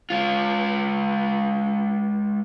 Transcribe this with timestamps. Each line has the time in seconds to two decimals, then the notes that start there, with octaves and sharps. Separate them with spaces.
0.10 G#3 F4